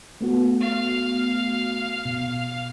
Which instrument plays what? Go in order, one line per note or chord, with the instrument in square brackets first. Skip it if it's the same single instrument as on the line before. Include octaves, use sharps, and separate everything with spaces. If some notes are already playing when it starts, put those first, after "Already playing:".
[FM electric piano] A3 B3 F#4
[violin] F5
[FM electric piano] B2